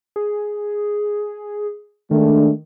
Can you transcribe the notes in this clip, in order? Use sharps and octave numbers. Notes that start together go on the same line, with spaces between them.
G#4
D#3 G#3 A3 D4